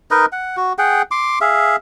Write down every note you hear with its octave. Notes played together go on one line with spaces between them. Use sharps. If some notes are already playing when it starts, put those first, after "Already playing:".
D#4 A#4 B4 D#5
F#5
F#4
G#4 F#5 G5
C6 D6
G#4 E5 F5